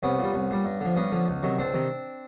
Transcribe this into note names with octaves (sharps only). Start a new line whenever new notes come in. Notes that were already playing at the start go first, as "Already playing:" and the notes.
C2 B3 C#4
A#2 G3
C2
A#2 G3
G2
D3 F3
G2 B3 C#4
D3 F3
C#2
C3 D#3 F#3
C#2 C4 D4
C3 D#3